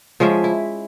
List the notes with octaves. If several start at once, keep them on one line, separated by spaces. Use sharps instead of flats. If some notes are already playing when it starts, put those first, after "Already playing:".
F3 G#3 C#4 E5
E4